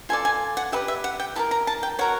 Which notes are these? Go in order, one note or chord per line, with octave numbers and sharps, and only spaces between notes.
F4 A4 D5 G#5
G#5
F#5
G4 B4 D5 E5
E5
F#5
G5
E4 G4 A#4 A5
A#5
A5
G5
F#4 A#4 C#5 F#5